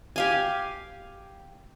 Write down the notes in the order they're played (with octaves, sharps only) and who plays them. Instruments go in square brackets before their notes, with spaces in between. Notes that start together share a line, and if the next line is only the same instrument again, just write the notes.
[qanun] G4 F5 G#5